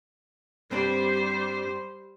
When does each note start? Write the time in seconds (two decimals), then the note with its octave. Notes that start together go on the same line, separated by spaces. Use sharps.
0.71 G2 G3 C4 D4 C5